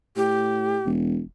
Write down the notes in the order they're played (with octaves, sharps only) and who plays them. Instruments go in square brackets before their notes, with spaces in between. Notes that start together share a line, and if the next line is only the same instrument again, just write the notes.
[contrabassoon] A2 [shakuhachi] G4
[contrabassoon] E1